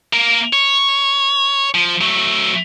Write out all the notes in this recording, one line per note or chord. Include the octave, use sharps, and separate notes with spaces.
A#3 A#4
C#5
F3
F#3 A3